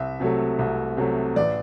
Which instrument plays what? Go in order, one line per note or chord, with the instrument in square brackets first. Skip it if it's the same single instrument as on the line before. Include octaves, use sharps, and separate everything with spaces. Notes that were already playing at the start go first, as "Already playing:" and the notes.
Already playing: [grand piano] C2 E5
C3 F#3 A3
C2
C3 F#3 A3
A1 D5